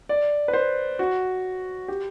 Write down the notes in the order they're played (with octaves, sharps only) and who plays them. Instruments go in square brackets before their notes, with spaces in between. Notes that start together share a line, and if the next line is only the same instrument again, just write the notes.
[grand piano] D5
B4
C5
F#4
G4